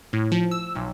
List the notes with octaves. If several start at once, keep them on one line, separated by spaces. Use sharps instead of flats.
A2
F3
E6
B1